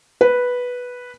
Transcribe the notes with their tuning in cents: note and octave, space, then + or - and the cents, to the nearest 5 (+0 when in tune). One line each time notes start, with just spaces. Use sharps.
B4 -5